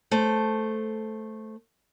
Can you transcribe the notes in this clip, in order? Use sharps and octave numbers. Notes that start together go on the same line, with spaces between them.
A3 C5